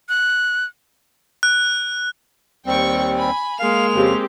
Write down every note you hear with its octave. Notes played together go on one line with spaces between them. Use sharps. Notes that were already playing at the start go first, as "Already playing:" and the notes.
F#6
F#6
D#2 G3 C4 G5 C#6
G#5 B5
G#3 A#3 F5 F7
F2 C#3 C4 G4